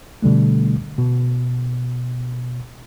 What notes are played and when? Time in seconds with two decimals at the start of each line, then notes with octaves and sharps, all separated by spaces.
0.22 B2 D3 G3 A3
0.99 B2